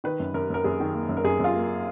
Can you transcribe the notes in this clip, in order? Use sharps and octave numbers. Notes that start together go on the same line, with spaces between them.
D#3 B4
F#2
F#2 A#4
F#2 A#4
F#2 G#4
D#3
A#3
F#2
A#4
F#2 G#4
F#2 F4
A#3